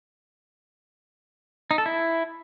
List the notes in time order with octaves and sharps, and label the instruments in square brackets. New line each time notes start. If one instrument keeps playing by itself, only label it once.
[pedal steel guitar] D#4
A4
E4